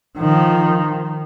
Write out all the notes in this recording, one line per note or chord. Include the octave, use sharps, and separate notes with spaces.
D#3 F3